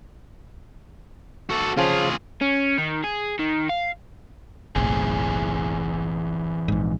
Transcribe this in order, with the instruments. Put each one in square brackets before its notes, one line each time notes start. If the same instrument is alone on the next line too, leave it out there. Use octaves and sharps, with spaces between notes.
[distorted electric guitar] F#4 A4
[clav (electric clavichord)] C#3 F3 [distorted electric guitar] F4 G#4
[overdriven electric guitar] C#4
D#3
G#4
D#3
F5
[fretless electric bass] F#1 B1 A2 [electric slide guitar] E3 C4 G#4
[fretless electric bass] A#1 G#2